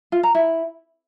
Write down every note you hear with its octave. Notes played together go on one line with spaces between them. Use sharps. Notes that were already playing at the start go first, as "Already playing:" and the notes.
F4
A#5
E4